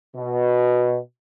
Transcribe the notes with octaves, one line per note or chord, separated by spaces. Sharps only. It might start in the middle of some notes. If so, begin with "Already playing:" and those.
B2